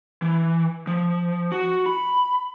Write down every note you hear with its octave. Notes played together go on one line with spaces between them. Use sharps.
E3
F3
F#4
B5